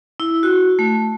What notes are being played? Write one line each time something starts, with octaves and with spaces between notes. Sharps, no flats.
E4
F#4
A3